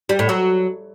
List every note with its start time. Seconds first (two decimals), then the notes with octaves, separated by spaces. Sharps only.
0.09 G3
0.19 A2
0.29 F#3